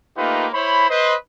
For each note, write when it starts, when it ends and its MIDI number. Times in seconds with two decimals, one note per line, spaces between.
0.18 0.48 57
0.18 0.48 58
0.18 0.48 63
0.18 0.48 65
0.18 0.48 67
0.18 0.48 71
0.54 0.89 64
0.54 0.89 72
0.54 0.89 73
0.54 0.89 83
0.90 1.15 71
0.90 1.15 72
0.90 1.15 75